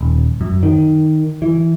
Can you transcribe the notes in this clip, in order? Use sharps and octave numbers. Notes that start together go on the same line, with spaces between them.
D#1
F#2
D#3
E3